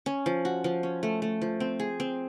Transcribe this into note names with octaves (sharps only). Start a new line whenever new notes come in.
C#4
F3
F#4
F3
C#4
A3
A3
F3
C4
G#4
C4